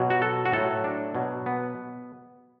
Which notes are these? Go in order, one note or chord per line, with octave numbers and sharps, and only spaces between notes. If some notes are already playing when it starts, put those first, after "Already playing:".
Already playing: B2 F#3
F#4
A4
F#4
A2 F#3 A4
D4
B2 F#3
B3